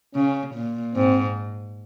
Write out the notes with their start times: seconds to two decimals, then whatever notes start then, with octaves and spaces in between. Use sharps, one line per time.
0.15 C#3 C#4
0.55 A#2
0.95 G#2 C4